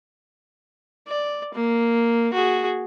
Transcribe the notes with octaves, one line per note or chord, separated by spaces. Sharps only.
D5
A#3
F#4 G#4